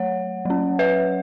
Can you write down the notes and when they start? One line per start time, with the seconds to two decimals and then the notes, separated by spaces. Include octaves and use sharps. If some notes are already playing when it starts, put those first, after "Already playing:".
Already playing: F#3 A3 C#5 F#5
0.45 F#3 C#4
0.79 B4 E5